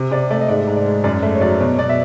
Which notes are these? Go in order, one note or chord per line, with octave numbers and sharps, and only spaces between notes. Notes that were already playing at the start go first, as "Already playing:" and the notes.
Already playing: C3
C3 D5
A3 D5
D#5
G#2 D5
G#2
D5
G#3
F#2 D5
A3
C#5
F#3 D5
B2 C#5
B2 D5
E5